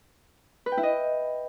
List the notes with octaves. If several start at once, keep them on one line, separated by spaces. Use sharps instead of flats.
B4
G5
E4
D#5